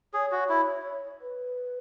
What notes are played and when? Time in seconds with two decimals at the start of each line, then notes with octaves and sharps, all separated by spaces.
0.13 G#4 C#5
0.32 F#4
0.49 E4
1.21 B4